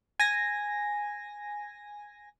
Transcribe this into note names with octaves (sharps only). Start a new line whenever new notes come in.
G#5 A#6